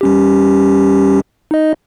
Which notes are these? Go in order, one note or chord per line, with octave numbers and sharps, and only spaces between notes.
G3 C#4 G4
D#4 D#5